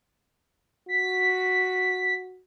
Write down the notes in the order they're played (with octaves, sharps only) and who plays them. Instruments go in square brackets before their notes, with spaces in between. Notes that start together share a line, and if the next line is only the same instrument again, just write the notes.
[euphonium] F#4 [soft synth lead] B6